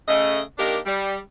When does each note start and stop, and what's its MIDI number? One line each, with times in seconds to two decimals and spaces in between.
0.08 0.41 49
0.08 0.41 57
0.08 0.41 75
0.58 0.78 51
0.58 0.78 58
0.58 0.78 62
0.58 0.78 67
0.58 0.78 70
0.58 0.78 75
0.86 1.17 55